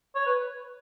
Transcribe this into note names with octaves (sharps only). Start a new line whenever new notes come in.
C#5
B4